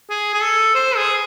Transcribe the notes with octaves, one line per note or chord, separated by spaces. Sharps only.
G#4
G#4
A4
C5
G#4